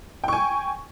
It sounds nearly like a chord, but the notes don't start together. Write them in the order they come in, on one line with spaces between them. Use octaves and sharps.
G5 C#6 G#5